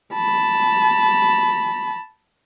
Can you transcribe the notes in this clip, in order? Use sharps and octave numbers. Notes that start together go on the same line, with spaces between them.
A5 B5